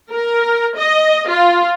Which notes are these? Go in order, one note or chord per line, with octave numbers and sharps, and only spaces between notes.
A#4
D#5
F4